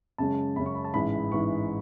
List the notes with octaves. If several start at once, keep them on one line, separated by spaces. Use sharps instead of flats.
F#2 C#3 G#3 C#4 A5
F#2 C#3 G#3 C#4 B5
C#6
B5
A5
A1 G#2 E3 G#3 B5
A1 G#2 E3 G#3 C#6